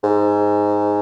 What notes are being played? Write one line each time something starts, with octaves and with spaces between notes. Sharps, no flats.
G#2